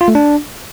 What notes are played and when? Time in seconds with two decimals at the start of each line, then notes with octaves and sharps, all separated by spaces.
0.01 F4
0.08 A3
0.15 D4